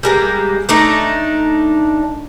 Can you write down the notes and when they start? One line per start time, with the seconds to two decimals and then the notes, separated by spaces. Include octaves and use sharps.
0.03 G3 G#3 A#3
0.69 A3 D4 D#4